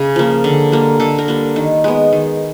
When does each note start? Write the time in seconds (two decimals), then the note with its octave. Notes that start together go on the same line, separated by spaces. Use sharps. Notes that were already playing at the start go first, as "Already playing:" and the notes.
Already playing: C#3 G#4
0.16 F3 A#3
0.44 D3
0.72 G3 A#3
1.00 D3 A4
1.19 A#4
1.28 G3 A#3
1.56 D#3
1.84 G#3 B3
2.13 D#3